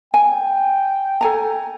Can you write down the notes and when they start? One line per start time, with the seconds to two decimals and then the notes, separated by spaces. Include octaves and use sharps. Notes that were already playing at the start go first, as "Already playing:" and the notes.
0.14 G5 G#5
1.21 A4 G#5 A#5